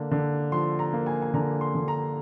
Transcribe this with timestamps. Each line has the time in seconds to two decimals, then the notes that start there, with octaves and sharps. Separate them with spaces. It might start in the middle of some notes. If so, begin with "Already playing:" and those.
Already playing: D3 A#3
0.11 D3
0.52 F3 C6
0.79 A#5
0.93 A#3
1.06 G#5
1.22 G#5
1.34 D3 A#5
1.61 C6
1.75 D3
1.88 A#5